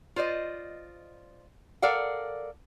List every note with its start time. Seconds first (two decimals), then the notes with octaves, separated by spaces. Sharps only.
0.16 F4 C5 D5 D#5
1.82 A4 A#4 D5 F5 F#5